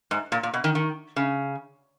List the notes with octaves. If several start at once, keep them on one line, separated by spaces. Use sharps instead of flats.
G#2
A#2
A#2
B2
D#3
D#3
C#3